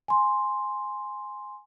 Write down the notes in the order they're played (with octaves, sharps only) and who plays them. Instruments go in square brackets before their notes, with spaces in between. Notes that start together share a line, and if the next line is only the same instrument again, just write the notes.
[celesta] G#5 C6